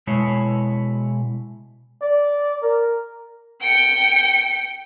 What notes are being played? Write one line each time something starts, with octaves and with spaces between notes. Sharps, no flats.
B2 G#3 E4 C#5
D5
A#4
G5 C#7